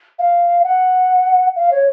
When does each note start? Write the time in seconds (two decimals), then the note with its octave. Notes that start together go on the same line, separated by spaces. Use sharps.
0.19 F5
0.64 F#5
1.56 F5
1.71 C#5